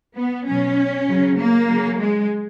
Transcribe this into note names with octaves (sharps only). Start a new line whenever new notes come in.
B3
B2 F#3 C#4
C#3 F#3
A#3
C#3 F#3
G#3